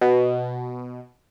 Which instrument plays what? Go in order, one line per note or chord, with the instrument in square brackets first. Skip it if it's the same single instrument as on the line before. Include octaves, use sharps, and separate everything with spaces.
[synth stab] B2